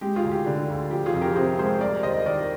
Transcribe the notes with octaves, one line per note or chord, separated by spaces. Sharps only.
G#3 G4
F4 G#4
D2
G4
D3
D2
F3 G4
F4 G#4
F2
G4 A#4
C3 G#4 C5
G#3 G#4 C5
G3 A#4 D5
D#2 C5 D#5
D#3 A#4 D5